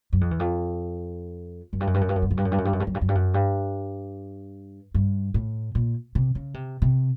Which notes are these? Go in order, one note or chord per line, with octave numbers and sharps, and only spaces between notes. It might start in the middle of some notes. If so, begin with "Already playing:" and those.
F#2
F2
E2
F2
F#2
G2
F#2
G2
F#2
G2
F#2
G2
F#2
G2
F#2
G2
F#2
G2
F#2
G2
F#2
G2
F#2
G2
F#2
G2
G2
A2
A#2
C3
C#3
C3
C3